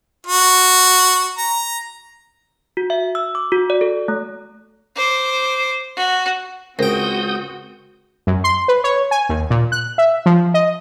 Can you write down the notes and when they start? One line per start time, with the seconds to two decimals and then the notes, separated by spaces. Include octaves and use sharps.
0.27 F#4
1.38 A#5
2.77 F#4
2.90 E5
3.15 E6
3.35 D6
3.52 F#4
3.70 D5
3.81 A4
4.08 A3
4.96 C5 D6
5.96 F#4
6.79 C#2 C4 F#4 A#4 C5 G5 D#6 G6
8.27 F#2
8.44 C6
8.68 B4
8.84 C#5
9.11 G#5
9.29 D#2
9.50 A#2
9.72 F#6
9.98 E5
10.26 F3
10.54 D#5